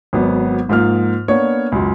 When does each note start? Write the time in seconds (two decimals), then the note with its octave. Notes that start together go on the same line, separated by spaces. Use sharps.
0.13 G#1 F#3 B3
0.69 G#2 F3 A#3 F6
1.28 A#3 B3 D4 C#5
1.72 C#2 F#2